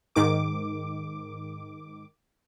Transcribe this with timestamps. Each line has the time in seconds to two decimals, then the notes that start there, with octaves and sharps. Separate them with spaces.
0.16 G#2 D#3 D6